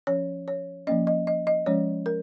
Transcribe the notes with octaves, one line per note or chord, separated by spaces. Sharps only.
F3 C#4 C#5
C#5
F3 A#3 C#4 D#5
D#5
D#5
D#5
F3 G#3 C#4 C#5
A#4